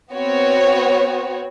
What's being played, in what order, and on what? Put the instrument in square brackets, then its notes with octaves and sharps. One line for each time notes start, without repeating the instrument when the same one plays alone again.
[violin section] B3 C4 F#4 C#5